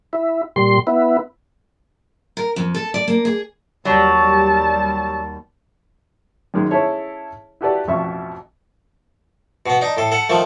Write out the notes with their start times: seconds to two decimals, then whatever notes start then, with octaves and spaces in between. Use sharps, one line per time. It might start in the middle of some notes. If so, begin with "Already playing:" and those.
0.13 E4
0.56 A#2 G3 C6
0.87 B3 E4
2.37 A#4
2.56 F2
2.74 A4
2.94 D5
3.08 A#3
3.25 G#4
3.85 D#2 F#3 G3 A5
6.54 F#2 D#3 G#3
6.71 C#4 E4 G#4 A4 C#5
7.61 E4 F#4 G4 A4 B4 D5
7.88 A1 F2 B2 F4 E5 C#6
9.66 B2 B3
9.81 D4 D#4
9.97 A2 A4
10.12 A4 F#5
10.29 D#3 F3 A3